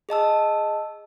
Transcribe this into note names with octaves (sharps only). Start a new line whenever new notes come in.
G#4 D#5 A5 E6